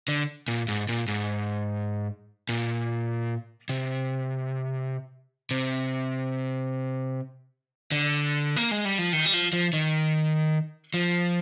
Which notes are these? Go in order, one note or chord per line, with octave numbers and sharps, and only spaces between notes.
D3
A#2
G#2
A#2
G#2
A#2
C3
C3
D3
A#3
G#3
G3
F3
D#3
G3
F3
F3
D#3
F3